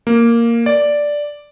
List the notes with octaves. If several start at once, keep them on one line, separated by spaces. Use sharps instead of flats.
A#3
D5